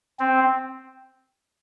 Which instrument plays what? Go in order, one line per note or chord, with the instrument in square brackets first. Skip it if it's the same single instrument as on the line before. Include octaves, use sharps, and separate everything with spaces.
[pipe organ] C4